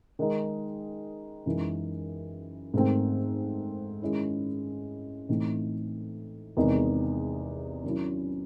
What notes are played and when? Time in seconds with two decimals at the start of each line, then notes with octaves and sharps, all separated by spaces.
0.19 D#3 G#3 D#4
1.46 F#2 E3 G#3 D#4
2.74 G#2 D#3 A3 C4
4.02 D#3 G#3 C#4 E4
5.29 A2 E3 A3 C4 D#4
6.57 E2 C3 D#3 G#3 D#4
7.84 D#3 F#3 C#4 E4